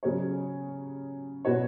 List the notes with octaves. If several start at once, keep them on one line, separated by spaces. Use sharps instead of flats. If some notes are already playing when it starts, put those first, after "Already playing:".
C#3 F#3 C#4 G#4 C#5
B2 B3 F#4 C#5